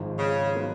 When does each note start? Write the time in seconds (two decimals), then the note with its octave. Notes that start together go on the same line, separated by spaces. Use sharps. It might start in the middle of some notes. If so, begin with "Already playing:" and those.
Already playing: G#1 G#2 F3
0.19 C#3
0.55 D#3 F#3 B3